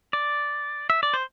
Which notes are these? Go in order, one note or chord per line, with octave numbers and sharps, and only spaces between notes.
D5
E5
D5
C5